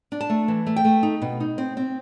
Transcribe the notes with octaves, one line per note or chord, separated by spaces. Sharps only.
D4
A5
A3
E3
A3
G5
A3
D#4
B2
D#4
C4
C4